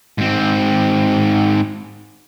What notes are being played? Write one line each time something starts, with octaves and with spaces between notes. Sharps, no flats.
G#2 C4